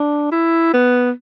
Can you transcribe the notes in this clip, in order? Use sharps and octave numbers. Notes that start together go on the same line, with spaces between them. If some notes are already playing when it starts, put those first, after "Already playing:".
Already playing: D4
E4
B3